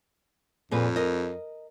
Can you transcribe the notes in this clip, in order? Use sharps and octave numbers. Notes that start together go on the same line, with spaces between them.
F2 A#2 G#4 B4
A#4 D#5